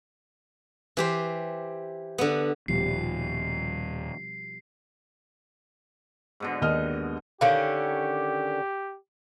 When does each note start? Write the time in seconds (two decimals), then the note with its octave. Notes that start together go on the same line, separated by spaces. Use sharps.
0.97 E3 G4 C5
2.18 D3 B3
2.68 D#1 B2 F3 G3 C7
6.40 G#2 B2 D3
6.62 D#2 D#5 F6
7.41 D3 D#3 C#4 G4 F5